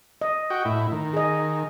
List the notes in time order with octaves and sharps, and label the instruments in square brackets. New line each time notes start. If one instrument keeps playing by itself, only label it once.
[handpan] D#5
[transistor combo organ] F#4 G5
A2 E4
D#3
[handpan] G#4 D#5